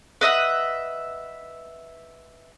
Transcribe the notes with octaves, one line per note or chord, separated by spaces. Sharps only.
B4 D#5 E5 F#5